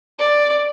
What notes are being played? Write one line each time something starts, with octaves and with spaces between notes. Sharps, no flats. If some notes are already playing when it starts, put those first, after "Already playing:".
D5